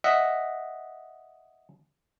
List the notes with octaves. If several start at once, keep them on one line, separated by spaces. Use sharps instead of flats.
D#5 E5 F#5